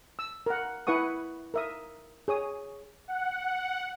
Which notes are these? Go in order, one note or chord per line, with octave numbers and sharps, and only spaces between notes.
E6
A#4 F#5
E4 B4 F#5 C#6 D#6
A#4 E5 D#6
G#4 C#5 D#6
F#5